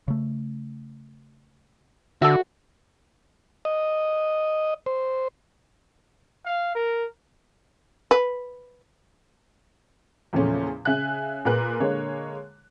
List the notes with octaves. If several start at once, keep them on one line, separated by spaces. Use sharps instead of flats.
C#3 A3
D3 F#4 A4 E5
D#5
C5
F5
A#4
B4
E2 A#2 C#3 F3 A3 C#4
C#3 E5 G#5 F#6
A#2 G#4 A#4 B4 F#6
D3 G#3 A#3 C#5